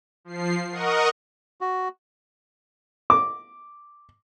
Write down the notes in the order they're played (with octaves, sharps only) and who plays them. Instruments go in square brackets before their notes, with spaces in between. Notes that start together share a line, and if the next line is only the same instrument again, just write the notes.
[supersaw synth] F3 C7
A#4 D#5 F#5 C#6 D#6
[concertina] F#4
[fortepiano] D6